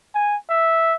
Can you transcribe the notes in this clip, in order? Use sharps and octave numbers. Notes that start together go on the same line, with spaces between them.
G#5
E5